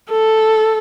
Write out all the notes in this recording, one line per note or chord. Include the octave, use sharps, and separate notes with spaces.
A4